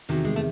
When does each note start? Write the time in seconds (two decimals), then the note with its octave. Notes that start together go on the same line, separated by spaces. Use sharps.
0.09 E2 C3 D#3 F#3
0.25 G#3
0.36 A3